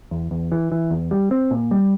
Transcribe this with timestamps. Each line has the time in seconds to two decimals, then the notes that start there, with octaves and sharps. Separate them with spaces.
0.11 E2
0.31 E2
0.52 E3
0.72 E3
0.91 E2
1.11 G3
1.31 C4
1.51 A#2
1.71 G3